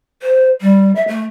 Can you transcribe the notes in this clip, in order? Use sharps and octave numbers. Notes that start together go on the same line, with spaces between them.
C5
G3
E5
A3